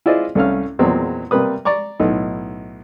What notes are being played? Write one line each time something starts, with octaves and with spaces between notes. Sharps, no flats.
E4 F4 G#4 C5 D5 D#5
C2 A3 C#4 F5 F6
E2 A#2 F#3 G#3 C4
C3 G3 A#3 B4 D#6
D5 A#5 C#6 D6
B1 A2 D#4